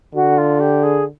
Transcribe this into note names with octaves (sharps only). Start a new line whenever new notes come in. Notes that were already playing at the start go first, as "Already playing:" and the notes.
D3 F#4
F4
G4
G#4